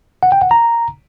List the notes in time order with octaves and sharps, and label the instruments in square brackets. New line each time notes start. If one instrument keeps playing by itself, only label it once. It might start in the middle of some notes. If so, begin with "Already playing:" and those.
[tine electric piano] F#5
G5
F#5
A#5